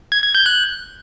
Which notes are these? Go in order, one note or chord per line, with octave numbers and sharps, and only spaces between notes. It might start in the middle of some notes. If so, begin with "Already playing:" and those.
G#6
G#6
G6
F#6